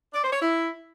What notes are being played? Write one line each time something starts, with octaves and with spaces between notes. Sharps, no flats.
D5
C5
C#5
E4